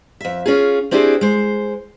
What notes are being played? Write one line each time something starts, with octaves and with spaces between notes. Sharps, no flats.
F2 E5
C#4 F4 G#4
C4 D4 E4 G4 G#4 C5
G#3 C5